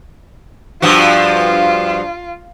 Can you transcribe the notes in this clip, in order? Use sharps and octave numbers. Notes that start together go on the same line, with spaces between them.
G2 F3 F4 F#4